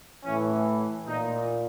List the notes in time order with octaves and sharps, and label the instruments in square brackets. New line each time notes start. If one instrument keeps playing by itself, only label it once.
[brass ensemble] A2 E3 C#4
A#2 D#4